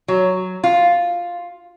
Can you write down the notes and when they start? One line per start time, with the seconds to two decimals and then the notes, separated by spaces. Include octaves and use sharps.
0.08 F#3
0.64 F4